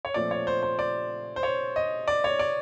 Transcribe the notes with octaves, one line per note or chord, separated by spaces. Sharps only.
C#5
A#2 F3 A3 C4 D5
C#5
C5
C5
D5
C5
C#5
D#5
D5
C#5
D5